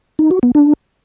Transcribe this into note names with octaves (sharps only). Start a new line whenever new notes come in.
D#4
F#4
B3
D4